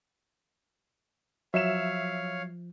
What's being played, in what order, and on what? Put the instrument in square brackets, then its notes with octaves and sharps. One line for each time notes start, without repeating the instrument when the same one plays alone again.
[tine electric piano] F3 [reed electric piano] F#3 [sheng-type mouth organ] C#5 F5 [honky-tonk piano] E5 E7